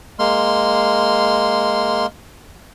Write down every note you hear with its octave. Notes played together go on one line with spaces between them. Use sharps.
G#3 A#3 C6 F6